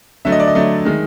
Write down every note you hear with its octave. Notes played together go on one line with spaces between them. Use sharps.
D3 F#3 A3 E5
D#5
D5
D#5
D3 F#3 A3
D#3 G#3